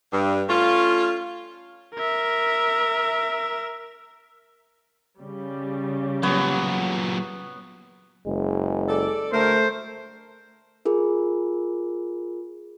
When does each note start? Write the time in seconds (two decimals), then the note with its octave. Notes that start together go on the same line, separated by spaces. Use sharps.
0.12 G2
0.49 A3 C#4 F4
1.94 A#4 E5
5.19 C#3 G3
6.23 A#2 F#3 B3 C#5
8.26 F#1 G#3
8.89 A4 D5
9.32 D2 A3 A#4 C5
10.85 F4 G#4 A#4